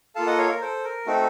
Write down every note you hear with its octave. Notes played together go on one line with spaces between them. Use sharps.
A#3 F4 A4 F5 A5
D#5 F#5
C#5 F5
A#4
A4 C5
A#4
A3 C4 D#4 F#4 A4